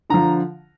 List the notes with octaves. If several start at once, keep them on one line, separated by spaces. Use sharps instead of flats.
D3 F3 A#5